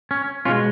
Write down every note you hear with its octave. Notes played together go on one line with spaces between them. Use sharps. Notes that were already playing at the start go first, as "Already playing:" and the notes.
C#4
B2 G#3 C#4 F4